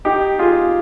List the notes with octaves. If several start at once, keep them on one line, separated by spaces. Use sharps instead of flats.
D#4 G4
F4 G#4